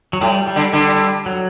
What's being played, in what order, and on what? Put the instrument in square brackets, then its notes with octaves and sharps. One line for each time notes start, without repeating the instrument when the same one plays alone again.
[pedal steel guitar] F#3
[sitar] A2 [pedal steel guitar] G3
[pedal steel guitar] G3
[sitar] D3
[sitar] D3 [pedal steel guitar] G3
[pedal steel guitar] F#3